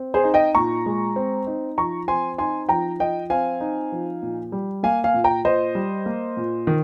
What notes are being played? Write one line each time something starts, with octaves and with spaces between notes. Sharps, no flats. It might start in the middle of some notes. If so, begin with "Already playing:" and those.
Already playing: C4
G#4 C5
D#4
D#5 G5
A#2 A#5 C#6
G#3
C4
D#4
F3 A#5 C#6
C4 G#5 C6
D#4 G#5 C6
F3 G5 A#5
F3 D#5 G5
C4 F5 G#5
D#4
F3
A#2
G3
A#3 F5 G#5
F5 G#5
A#2
G5 A#5
A#2 C5 D#5
G3
A#3
A#2
D#3